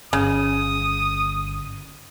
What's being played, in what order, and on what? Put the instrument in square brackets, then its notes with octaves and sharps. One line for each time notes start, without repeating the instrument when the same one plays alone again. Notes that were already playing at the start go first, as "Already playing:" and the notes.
[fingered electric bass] G1 [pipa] C#3 [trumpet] D#6